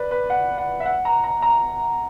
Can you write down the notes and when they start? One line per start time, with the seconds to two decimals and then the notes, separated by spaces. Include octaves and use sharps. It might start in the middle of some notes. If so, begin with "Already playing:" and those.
Already playing: B4 D5
0.11 B4
0.30 F#5
0.58 F#5
0.80 E5
0.86 F#5
1.05 A#5
1.24 A#5
1.42 A#5